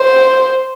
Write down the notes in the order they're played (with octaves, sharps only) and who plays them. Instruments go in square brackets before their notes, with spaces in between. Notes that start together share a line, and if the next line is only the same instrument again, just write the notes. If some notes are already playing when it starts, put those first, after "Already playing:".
Already playing: [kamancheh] C5